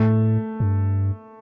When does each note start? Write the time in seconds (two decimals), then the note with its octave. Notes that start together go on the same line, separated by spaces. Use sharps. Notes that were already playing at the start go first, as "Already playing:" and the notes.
Already playing: A2 A3
0.60 G2